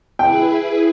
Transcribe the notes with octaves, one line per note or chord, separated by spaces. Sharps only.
E4 G#4 B4 G5